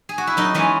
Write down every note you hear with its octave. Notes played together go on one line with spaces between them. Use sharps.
G#4
F#4
E4
F#2 D#4
E3 G#3 C#4